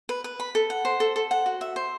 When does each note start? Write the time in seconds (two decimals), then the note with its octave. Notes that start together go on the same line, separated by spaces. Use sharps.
0.09 B4
0.24 B4
0.40 B5
0.55 A4
0.70 F#5
0.85 C5
1.00 A4
1.16 A4
1.31 F#5
1.46 F#4
1.61 E5
1.76 C5